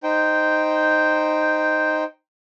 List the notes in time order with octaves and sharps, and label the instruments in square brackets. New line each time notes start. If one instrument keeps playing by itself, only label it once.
[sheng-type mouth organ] D#4 C5 G5